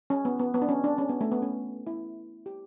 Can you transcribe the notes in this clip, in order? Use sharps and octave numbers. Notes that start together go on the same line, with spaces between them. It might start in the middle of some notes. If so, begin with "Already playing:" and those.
C#4
B3
B3
B3
D4
C#4
D4
C#4
B3
A3
B3
C#4
E4
G4